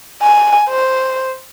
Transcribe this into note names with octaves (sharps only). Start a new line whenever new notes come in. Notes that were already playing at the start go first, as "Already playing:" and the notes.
G#5
C5